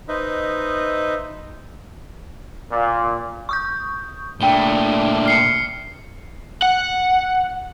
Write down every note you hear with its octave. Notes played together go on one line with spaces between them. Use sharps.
D#4 B4 C5 D#5 E5
A#2
C#6 D#6 G6
A#2 A3 D4 G5 G7
F6 C7 C#7
F#5